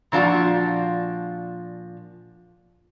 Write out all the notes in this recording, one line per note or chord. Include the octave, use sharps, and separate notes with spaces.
A#2 F3 D4 F4 F#4